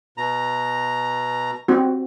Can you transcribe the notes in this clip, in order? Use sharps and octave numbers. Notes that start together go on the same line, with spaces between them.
B2 A#5
C4 F#4